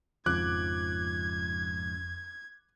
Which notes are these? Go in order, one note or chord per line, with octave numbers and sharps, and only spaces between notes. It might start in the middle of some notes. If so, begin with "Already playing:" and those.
G#1 F2 G#2 C#3 F3 D6 F#6 G#6